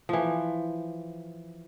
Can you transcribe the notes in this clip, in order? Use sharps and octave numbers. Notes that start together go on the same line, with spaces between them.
E3 F3